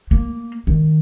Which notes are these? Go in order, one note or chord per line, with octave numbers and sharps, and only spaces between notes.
A#3
D#3